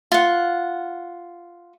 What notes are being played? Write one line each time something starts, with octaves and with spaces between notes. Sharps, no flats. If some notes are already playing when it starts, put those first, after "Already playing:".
F4 F#5